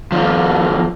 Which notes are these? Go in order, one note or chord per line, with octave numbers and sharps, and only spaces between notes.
D#2 F3